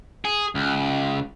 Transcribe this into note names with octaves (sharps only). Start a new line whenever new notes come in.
G#4
C#2